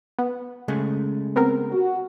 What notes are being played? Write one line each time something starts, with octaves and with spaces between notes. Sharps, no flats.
B3
C#3 G#3 A3
B3 C4 A#4
F#4